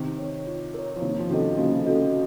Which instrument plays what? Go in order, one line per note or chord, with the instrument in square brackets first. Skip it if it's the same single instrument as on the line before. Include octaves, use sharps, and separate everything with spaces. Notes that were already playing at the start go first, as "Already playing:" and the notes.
Already playing: [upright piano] C3 D#3
[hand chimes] A#4 C#5
F4
A#4 C#5
[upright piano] F3
[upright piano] C3 D#3 [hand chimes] A#3
[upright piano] F3
[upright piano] C3 D#3 [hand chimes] C#4 F#4 A4 D#5
[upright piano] C#3 F3 [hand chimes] A#3
[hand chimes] C#4 F#4 A4 D#5